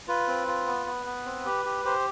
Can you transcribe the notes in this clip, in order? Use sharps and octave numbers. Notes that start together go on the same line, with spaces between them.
F4 B4
C4
F4
B3
B3
B3
C4
G4
G4
G4 C5